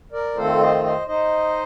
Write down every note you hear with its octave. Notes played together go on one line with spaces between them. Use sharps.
A#4 D5
F2 D#3 A3 C4 F4 A4 C5
C5 D#5
C5 D#5
D#4 C5 D#5